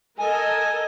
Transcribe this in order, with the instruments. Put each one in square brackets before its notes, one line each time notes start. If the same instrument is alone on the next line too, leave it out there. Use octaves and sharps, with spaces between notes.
[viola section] A4 A#4 D#5 [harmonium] G#5